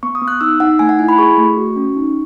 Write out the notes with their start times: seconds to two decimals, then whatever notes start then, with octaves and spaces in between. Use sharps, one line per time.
0.03 B3 C#6
0.15 D#6
0.22 B3
0.28 F#6
0.41 D#4 E6
0.60 D#4 F#5
0.79 A3 G#5
0.89 F#5
0.99 E4 G#5
1.09 B5
1.18 G#4 C#6
1.37 A3
1.57 F#4
1.76 C#4
1.96 D#4